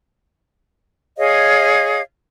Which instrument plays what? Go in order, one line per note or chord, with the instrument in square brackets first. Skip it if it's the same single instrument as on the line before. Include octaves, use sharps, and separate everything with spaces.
[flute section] G#4 C#5 D#5 F5